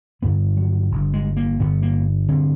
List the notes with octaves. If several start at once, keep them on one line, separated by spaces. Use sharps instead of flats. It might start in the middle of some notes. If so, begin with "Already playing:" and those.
G1 G2 D3 B3
F#3
G1 G2 D3
G#3
A#3
G1 G2 D3 B3
A#3
G2 D3 C4